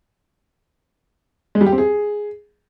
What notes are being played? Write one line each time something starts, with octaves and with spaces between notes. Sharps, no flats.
G#3
G3
G4
C4
G#4